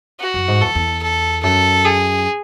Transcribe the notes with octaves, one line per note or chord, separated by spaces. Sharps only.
F#4
F#2
G#2
E2 A4
E2
A4
F#2 A4
G#4